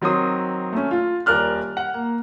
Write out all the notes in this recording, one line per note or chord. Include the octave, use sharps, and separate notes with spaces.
D#3 F#3 C4 C6 D#6
A3 C#4
F4
D#1 A#4 D5 F6 F#6
F#5
A#3